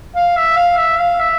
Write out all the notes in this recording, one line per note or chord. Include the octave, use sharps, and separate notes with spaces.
F5
E5
F5
E5
F5
E5